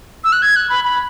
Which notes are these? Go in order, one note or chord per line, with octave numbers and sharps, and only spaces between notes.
E6
F#6
G#6
F#6
B5
B5